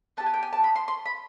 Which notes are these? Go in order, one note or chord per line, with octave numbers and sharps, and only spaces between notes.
B3 D4 G4 A5
G#5
G5
G#5
A5
B5
C6
C6
B5